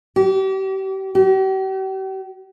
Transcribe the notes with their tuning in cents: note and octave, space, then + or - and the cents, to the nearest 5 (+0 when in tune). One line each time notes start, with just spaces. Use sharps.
G4 -35
G4 -45